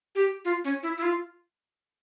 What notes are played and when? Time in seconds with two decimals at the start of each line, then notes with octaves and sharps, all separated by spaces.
0.15 G4
0.45 F4
0.64 C#4
0.83 E4
0.97 E4
1.02 F4